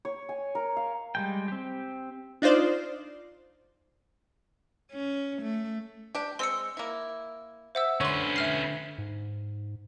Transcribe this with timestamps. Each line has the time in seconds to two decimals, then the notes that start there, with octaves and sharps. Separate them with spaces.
0.05 C#5
0.29 G#5
0.55 A#4
0.77 F5
1.15 G3 G#3 G5
1.48 C4 G4
2.42 D4 D#4 F4 C5 D5
4.91 C#4
5.42 A3
6.15 D4 G4
6.39 G#3 C4 C6 E6 C#7
6.77 A#3 E4
7.75 C5 E5 F#5 E6
8.01 D3 C#4 B4 C#5 C6
8.36 E5 F6 C7
8.98 G#2